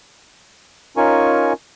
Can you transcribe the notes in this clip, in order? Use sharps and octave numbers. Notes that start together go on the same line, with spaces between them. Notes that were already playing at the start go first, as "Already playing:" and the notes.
C#4 D#4 F4 A#4 G#5 C#6